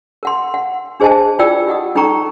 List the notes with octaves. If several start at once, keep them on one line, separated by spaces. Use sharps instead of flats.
A#4 F#5 C6
F#5
D4 G#4 C5 D#5 G#5 A5
E4 F4 B4 D5 G5 E6
G4 D#5 F#5 D#6
C#4 D#4 A4 G5 A#5 C#6